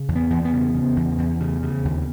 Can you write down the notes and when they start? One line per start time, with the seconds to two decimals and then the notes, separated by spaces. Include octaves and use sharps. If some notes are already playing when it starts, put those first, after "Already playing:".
Already playing: C#3
0.08 E2
0.15 B3
0.30 E2
0.45 B3
0.52 C#3
0.74 C#3
0.96 E2
1.18 E2
1.40 C#3
1.63 C#3
1.85 D#2